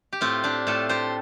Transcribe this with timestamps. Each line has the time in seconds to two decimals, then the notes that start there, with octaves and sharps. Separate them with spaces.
0.13 G4
0.21 A2 C4 F4
0.44 D4 G4
0.67 A2 F4 A4
0.89 G4 C5